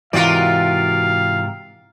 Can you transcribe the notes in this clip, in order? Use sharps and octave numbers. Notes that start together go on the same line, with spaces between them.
G#2 C3 E3 F4 F#4 A#4 D5 F5